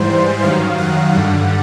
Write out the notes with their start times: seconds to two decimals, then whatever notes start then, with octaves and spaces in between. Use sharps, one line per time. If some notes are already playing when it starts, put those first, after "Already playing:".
Already playing: G#2 E3 G3 C5
0.42 F#2 D#3 F#3 F5
0.78 F#5
1.14 G2 D3 G3